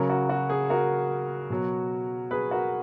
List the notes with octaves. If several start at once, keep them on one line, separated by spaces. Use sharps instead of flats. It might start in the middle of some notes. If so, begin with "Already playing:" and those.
Already playing: C#3 F#3 A#4 C#5
F#4
F#4
G#4
F#4 A#4
B2 F#3
G#4 B4
F#4 A#4